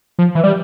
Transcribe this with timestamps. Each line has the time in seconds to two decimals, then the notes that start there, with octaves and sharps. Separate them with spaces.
0.19 F3
0.35 E3
0.44 G3